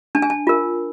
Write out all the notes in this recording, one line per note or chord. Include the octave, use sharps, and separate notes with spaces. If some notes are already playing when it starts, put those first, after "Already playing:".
D4 A5
G#5
A5
F4 A#4